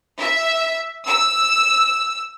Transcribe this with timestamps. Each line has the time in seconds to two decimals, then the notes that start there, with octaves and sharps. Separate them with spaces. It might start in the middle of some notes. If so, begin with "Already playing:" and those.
0.20 E5
1.07 E6